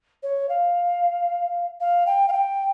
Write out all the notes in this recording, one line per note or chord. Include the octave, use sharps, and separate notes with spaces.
C#5
F5
F5
G5
F5
G5